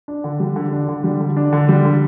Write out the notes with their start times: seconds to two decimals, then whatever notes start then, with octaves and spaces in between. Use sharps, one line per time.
0.08 D4
0.24 D3
0.40 G3
0.56 D3
0.72 D4
0.88 D3
1.04 G3
1.20 D3
1.37 D4
1.53 D3
1.69 G3
1.85 D3